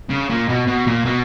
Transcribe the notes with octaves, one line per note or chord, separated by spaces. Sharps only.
C#3
A#2
B2
B2
A#2
B2